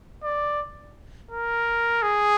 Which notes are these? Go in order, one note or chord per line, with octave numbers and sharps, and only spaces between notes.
D5
A#4
G#4